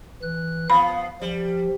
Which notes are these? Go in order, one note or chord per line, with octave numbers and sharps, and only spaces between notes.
E3 F#6
F3 B3 F5 B5
F3 G3